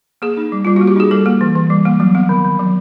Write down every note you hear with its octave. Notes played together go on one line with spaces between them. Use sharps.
A#3 G#4
D#4
G3
G3 F4
A#3 F#4
G4
D#4 G#4
G3 A4
A#3
E3
E3
G3
A#3
F#3
B3
D#3
D#3
F#3